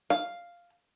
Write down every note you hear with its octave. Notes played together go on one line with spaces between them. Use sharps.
F5